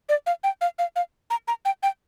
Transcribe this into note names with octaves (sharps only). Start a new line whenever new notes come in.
D5
F5
G5
F5
F5
F5
A#5
A#5
G5
G5